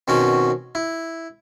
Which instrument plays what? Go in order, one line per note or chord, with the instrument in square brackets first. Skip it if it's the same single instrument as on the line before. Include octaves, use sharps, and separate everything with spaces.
[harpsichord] B2 D#3 C4 C#4 F#4
E4